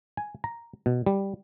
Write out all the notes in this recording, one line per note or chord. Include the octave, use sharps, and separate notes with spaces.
G#5
A#5
B2
G3